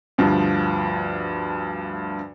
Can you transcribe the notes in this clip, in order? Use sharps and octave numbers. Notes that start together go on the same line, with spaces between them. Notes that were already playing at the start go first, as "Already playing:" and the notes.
D2 G2 F3